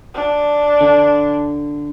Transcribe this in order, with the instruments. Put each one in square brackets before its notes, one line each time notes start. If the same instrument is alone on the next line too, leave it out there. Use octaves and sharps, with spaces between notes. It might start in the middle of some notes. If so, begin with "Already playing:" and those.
[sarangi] D4
[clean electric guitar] D3